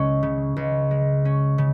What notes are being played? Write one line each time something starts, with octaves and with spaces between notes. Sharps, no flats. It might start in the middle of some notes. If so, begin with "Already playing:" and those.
Already playing: C#2 G#3 C#4
C#3
C#2
G#3
C#4
C#3